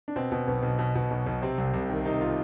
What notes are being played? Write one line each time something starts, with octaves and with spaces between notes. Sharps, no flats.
D4
B2 C4
B2
B1 B3
B1
B2
B2
B1
B1
C3 C4
C2
C2
D#3
C3 D#4
F4